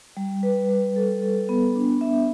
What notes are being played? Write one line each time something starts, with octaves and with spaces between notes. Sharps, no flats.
G3
B4
G3
A4
A4
B3
D4
E5